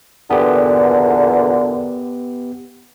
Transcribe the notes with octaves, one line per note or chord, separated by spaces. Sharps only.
E2 A#2 D3 B3 G4